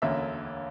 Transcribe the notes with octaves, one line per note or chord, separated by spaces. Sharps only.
E1 D2 D3 A#3 C#4 E5